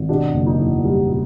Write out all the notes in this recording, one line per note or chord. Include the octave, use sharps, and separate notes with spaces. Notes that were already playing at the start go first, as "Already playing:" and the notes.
Already playing: G#1
B2 D4
F#1
D#4
E2
G3
B2